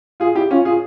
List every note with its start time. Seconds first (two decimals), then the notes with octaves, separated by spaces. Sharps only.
0.20 F4 G#4
0.35 E4 G4
0.51 C#4 F4
0.65 F4 G#4